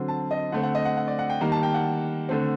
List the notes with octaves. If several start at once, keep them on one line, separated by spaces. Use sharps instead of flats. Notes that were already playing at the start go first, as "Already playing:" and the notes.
Already playing: D3 F#3 C4
A5
D#5
D3 A3 C4 F#5
F#5
D#5
F#5
F#5
D5
F#5
G5
D#3 G3 A#3 A#5
A5
G5
F#5
D3 A3 C4